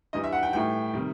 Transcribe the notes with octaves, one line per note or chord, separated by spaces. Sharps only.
G2 E3 G3 D#5
E5
F#5
G5
A2 E3 G3 G5
C3 D#3 G3